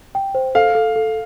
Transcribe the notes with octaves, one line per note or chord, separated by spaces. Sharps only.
G5
C5
A4 F5
A4
A4